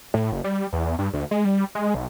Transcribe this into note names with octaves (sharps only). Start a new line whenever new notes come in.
A2
F#1
G3
E2
G2
D2
G#3
G3
G#3
B1